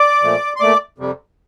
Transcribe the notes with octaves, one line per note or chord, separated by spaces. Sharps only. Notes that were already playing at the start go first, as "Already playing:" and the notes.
Already playing: D5 D6
A#2 F3 A3
C6
A#2 A3 D5 D6
F2 C3 G3